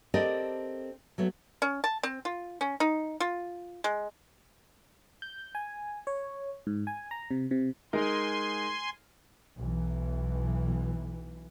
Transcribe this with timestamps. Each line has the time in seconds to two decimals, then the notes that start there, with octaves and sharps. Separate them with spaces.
0.14 C4 G4 A4 A#4 D5 D#5
1.18 F#3 A3 B3
1.62 C#4
1.84 A5
2.03 C4
2.25 F4
2.61 C#4
2.80 D#4
3.20 F4
3.84 G#3
5.22 G6
5.55 G#5
6.07 C#5
6.67 G#2
6.87 G#5
7.11 A#5
7.31 C3
7.51 C3
7.93 G#3 D#4 A#4 G#5 C6
9.59 B1 E3